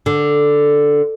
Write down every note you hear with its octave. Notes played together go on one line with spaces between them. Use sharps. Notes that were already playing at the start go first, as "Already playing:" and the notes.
D3